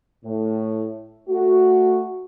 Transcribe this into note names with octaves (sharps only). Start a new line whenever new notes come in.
A2
A3 F#4